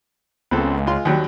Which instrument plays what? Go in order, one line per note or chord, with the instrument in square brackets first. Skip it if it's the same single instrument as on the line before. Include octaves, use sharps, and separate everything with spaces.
[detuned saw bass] C#2 [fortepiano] B3 C4 A4
[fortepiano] G#3 F4 C6
D#2 F#3 G3